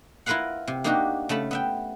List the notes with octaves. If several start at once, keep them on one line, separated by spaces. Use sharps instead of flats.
E4 F4 A#4 B4 F5 F#5
C3
A#3 D4 D#4 F#4 G4
C#3 A3 A5 B5
B3 E5 G5